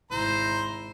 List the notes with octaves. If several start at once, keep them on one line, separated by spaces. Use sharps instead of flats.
G#1 E4 C5 A#5